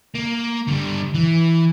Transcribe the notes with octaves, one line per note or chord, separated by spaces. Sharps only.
A#3
D3 G3
E3